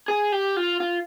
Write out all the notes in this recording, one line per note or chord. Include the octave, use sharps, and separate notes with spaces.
G#4
G4
F4
F4